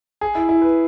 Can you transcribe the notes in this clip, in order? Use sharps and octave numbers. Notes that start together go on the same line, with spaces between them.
G#4
E4
E4
B4